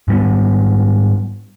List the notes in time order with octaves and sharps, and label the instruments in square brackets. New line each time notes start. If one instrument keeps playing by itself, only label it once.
[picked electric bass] G#2 G3 B3